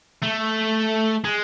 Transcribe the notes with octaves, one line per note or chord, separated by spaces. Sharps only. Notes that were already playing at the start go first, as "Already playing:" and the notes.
A3
G#3